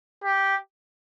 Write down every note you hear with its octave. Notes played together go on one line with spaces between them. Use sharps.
G4